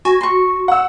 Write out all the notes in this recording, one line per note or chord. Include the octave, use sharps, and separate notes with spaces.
F#4 G#5
C6 C#6
F#5 E6